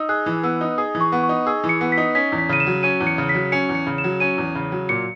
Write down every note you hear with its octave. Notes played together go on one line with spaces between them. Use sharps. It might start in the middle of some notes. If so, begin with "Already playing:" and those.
Already playing: D#4 E6
G#4 F#6
E3
B3 E6
D#4
G#4 D#6
E3
C#6
B3
C#6
D#4
G#4 E6
E3
C#7
B3
B6
D#4
C#4 B6
E2
B6
C#3 D#7
E7
F#3
C#4 D#7
E2
C#7
C#3
B6
F#3
C#4 C#7
E2
C#7
C#3
E7
F#3
C#4 D#7
E2
C#3
F#3
A#2 C#7